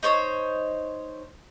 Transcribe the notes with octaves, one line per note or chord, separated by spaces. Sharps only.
D#4 C5 C#5